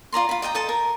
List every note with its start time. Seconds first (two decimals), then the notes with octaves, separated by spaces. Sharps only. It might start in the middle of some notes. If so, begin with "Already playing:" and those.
0.12 F4 D5 A#5 C6
0.29 F4 B5
0.42 D5 D#5 G5 A#5
0.55 A4 D#5 A5
0.69 A#4